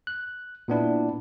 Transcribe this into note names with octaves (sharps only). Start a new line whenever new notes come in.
F#6
A#2 B3 D4 E4